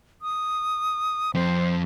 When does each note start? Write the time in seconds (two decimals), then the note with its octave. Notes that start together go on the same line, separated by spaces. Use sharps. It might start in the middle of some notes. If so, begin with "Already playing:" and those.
0.22 D#6
1.34 F2 C4 C5